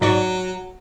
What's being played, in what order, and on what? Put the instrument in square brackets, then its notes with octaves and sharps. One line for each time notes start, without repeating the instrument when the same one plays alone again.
[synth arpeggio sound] G#2 D5 C#6 [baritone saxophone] F#3